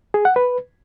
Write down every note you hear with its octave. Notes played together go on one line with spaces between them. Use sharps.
G#4
F#5
B4